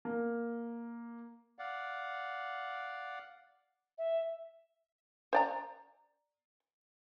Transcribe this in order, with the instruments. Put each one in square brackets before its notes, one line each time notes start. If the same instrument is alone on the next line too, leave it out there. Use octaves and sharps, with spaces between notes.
[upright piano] A#3
[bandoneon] D5 F5 F#5
[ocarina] E5
[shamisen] C5 D5 A#5